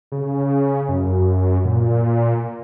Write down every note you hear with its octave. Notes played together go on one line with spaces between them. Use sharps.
C#3
F#2
A#2